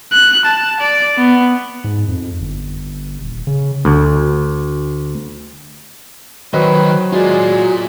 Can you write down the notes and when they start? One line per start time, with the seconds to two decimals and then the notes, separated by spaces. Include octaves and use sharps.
0.13 F#6
0.45 A5
0.80 D5
1.17 B3
1.84 G#2
2.08 F2
2.40 G1
3.21 D#1
3.47 C#3
3.85 D2
6.54 D#3 F#3 B4 C5 D#5
7.13 G#3 F4 F#4 D5